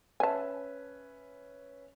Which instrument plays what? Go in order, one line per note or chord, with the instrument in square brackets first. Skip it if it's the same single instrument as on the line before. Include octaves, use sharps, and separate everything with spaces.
[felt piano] C#4 B4 E5 [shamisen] G#5 A5